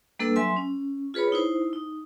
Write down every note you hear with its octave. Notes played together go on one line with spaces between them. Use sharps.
G3 A#3 D4 A4 B4 E6
F#3 E5 G#5 C6
C#4
F4 G#4 B4 C#5 B5
D#4 E4 C5
D#4